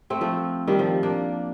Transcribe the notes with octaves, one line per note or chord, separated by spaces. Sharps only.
A3 C4
F3 A3
D#3 G3
F3
A#3 D4